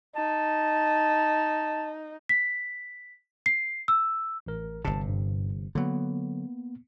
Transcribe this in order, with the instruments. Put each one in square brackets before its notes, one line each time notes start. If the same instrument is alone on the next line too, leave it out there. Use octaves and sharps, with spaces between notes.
[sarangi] D#4 [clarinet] A5
[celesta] B6
C7
E6
[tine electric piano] A1 A#4
[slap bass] G1 C3 [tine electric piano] A5
[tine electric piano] G2
[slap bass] D3 F#3 [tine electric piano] A#3 B3